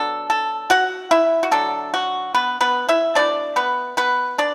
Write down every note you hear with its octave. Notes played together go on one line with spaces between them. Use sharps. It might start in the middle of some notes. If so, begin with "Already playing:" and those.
Already playing: F#3 B3 D4 A4
A4
F#4 F#5
E4 E5
F#4
D3 F#3 D4 A4
F#4
B3 B4
B3 B4
E4 E5
B2 A3 D4 E4 D5
B3 B4
B3 B4
D4 D5